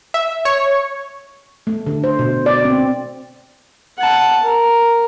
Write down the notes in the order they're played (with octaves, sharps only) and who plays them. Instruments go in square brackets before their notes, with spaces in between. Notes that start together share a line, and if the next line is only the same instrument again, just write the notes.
[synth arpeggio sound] E5
C#5
[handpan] A3
D3
C5
B2
D5
C4
[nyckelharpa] F#5 A5
A#4